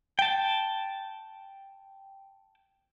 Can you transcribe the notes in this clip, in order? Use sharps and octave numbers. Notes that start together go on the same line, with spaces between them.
G5 A5